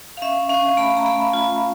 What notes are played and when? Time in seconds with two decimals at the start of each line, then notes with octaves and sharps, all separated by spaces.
0.17 F5
0.22 C#4 E5
0.49 C#4 F5
0.77 A3 B5
0.97 A#5
1.06 A3 B5
1.33 F4